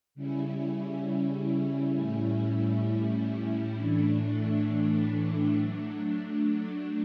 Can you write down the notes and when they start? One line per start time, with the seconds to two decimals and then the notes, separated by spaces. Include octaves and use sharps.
0.15 C#3 G3 C#4 E4
1.96 A2 G3 C#4 E4
3.76 A2 E3 A3 D4
5.57 F#3 A3 D4